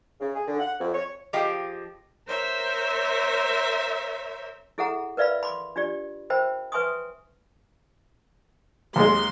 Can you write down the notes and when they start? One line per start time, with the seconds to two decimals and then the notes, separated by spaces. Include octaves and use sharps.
0.20 C#3
0.34 G#4
0.47 D3
0.60 F#5
0.80 F2
0.93 C#5
1.33 F3 G4 G#4 D#5 F5 G5
2.28 A#4 C5 C#5 E5
4.78 E4 G#4 A4 E5 F#5 A#5
5.17 A#4 B4 D5 E5 F5 B5
5.43 B5 C6 D6
5.76 D4 F4 G4 D5
6.30 A#4 C5 E5 G5 B5
6.72 B4 E5 G#5 C6 C#6 D#6
8.96 D#2 G#3 C6